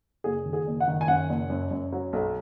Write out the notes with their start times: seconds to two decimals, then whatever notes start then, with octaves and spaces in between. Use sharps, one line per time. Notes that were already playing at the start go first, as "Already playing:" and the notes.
0.24 F#1 G#4
0.46 D#3
0.53 G#4
0.67 F#1
0.80 F#5
0.88 D#3
1.01 G#5
1.08 F#2 F#5
1.29 F#1
1.50 F#2
1.71 F#2
1.92 F#3
2.13 B1